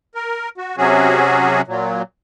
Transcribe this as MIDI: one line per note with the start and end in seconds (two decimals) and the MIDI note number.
0.15 0.49 70
0.58 0.77 66
0.77 1.61 48
0.77 1.61 54
0.77 1.61 61
0.77 1.61 66
0.77 1.61 68
1.68 2.02 46
1.68 2.02 54